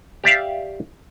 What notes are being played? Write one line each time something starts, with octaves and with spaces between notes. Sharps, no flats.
G4 D5 E5 F5